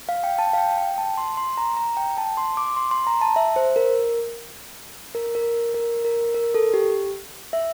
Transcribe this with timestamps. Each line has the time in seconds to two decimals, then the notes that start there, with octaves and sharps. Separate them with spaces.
0.09 F5
0.24 G5
0.39 A5
0.53 F5
0.58 G5
0.78 G5
0.98 A5
1.18 C6
1.37 C6
1.57 A#5
1.77 A#5
1.97 G5
2.18 A5
2.37 C6
2.57 D6
2.76 C6
2.91 C6
3.07 A#5
3.21 A5
3.36 E5
3.56 C5
3.76 A#4
5.15 A#4
5.35 A#4
5.74 A#4
6.05 A#4
6.34 A#4
6.54 A4
6.74 G4
7.53 E5